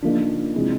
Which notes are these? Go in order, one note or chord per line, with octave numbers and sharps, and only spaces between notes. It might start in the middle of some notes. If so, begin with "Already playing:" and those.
C#3 F3 A#3 D4 D#4
C3 F3 G#3 C4 E4